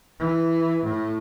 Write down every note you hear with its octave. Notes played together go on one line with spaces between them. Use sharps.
E3
A2